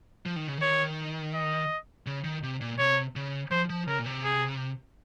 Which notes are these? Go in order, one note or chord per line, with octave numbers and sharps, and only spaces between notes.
F3
D#3
C#3
D#3 C#5
D#5
C#3
D#3
C3
A#2
C3 C#5
C#3
F3 C5
F3
C#3 A#4
A#2
C3
G#4